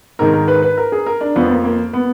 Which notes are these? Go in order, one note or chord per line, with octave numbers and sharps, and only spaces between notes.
G#2 D#3 A#4
A#4
B4
B4
A#4
G#4
A#4
D4
F2 F3 B3
A#3
A#3
B3